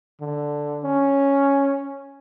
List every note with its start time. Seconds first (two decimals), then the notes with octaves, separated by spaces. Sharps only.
0.21 D3
0.84 C#4